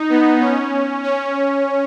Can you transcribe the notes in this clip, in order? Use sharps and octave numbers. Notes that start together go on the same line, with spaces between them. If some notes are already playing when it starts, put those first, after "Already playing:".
Already playing: D#4
B3
C#4
C#4